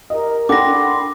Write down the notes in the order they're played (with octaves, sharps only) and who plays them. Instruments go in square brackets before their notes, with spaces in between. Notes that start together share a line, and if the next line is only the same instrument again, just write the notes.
[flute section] G4 A#4 [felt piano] D#5
[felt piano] D4 A4 F#5 [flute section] G5 B5 C6 [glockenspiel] D6 A#6